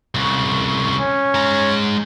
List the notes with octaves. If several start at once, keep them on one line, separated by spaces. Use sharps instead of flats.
C2 C#3
C#4
G#3 A#5